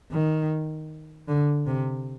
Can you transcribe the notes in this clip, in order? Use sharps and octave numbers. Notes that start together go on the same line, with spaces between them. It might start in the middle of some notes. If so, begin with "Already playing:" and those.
D#3
D3
C3